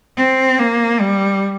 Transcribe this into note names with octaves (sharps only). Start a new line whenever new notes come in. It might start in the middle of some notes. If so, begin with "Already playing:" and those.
C4
A#3
G3